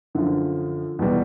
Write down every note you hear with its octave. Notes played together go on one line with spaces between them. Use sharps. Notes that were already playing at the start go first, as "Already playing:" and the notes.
F#2 D3 F3
E2 B2 G3